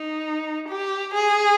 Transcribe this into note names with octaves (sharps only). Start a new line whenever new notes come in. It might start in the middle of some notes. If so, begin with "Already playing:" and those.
Already playing: D#4
G4
G#4